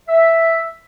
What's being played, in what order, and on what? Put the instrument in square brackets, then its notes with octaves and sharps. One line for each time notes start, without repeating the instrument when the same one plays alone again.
[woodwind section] E5